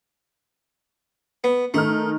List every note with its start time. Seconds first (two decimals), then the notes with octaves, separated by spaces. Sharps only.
1.44 B3
1.74 D#3 A3 D#4 F6